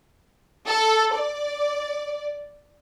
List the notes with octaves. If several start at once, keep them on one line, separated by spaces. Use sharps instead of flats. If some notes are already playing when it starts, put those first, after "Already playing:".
A4
D5